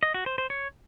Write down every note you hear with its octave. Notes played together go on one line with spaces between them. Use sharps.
D#5
F#4
C5
C5
C#5